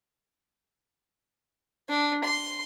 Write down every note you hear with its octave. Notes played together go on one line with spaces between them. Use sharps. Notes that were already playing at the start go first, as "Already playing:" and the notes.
D4
C6